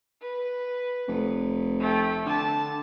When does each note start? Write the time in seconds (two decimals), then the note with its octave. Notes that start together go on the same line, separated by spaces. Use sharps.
0.22 B4
1.08 F1
1.80 A3 G5
2.26 D3 A5